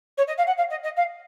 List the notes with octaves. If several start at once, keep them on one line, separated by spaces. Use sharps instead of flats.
C#5
D#5
F5
F#5
F5
D#5
D#5
F5